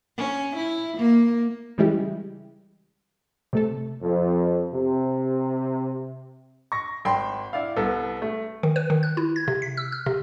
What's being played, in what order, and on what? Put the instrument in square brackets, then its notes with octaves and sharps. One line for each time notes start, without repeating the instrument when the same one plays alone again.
[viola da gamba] C#4
E4
A#3
[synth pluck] C#3 E3 G3 G#3 E4 G4
C3 A3 A4
[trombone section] F2
C3
[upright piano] C#6 A#6
G#1 G5 B5 C6 G6
E4 D5 F5
C2 B3 A4
A3
[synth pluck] D#3
B4
D#3
F#6
E4
G#6
C3
B6
E6
F6
C3